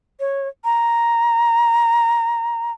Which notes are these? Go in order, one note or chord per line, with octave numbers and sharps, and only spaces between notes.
C#5
A#5